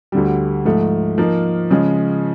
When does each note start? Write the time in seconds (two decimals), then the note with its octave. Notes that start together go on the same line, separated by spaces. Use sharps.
0.12 D2 D3 G3
0.65 G#2 F3 A3
1.18 F3 A#3 D#4
1.71 C#3 F3 G#3